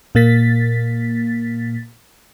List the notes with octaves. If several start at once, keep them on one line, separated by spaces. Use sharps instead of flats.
A#2 A#3 A6 B6